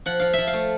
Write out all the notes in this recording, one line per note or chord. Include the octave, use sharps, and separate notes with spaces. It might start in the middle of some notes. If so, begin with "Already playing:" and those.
F3 F#5
F3 F5
F3 E5
F5
A3